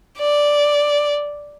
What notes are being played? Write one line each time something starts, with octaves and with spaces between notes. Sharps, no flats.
D5